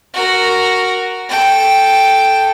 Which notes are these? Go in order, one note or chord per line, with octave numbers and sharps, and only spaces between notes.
F#4 A#4
A4 G5